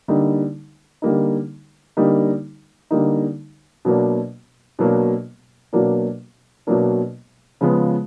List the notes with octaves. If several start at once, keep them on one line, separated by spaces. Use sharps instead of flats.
D3 G3 A#3 D#4
D3 G3 A#3 D#4
D3 G3 A#3 D#4
D3 G3 A#3 D#4
B2 F#3 A#3 D4
B2 F#3 A#3 D4
B2 F#3 A#3 D4
B2 F#3 A#3 D4
C#3 F3 G#3 B3